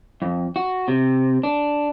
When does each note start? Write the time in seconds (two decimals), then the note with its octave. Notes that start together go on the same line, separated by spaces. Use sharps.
0.22 F2
0.56 F#4
0.88 C3
1.43 D4